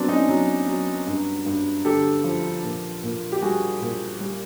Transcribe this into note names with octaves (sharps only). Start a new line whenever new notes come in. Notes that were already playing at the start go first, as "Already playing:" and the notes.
Already playing: F#3 B3 C4 D4
C#4 D#4
F#3
F#3
G2
G2
D3 G4 A4
F3
A#2
A#2
G4
G3 F#4 G#4
A#2
G3